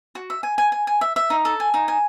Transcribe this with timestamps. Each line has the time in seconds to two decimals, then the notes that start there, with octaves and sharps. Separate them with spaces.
0.15 F#4
0.30 E5
0.43 G#5
0.58 G#5
0.72 G#5
0.87 G#5
1.01 E5
1.16 E5
1.30 D#4
1.45 A4
1.60 G#5
1.74 D#4
1.88 G#5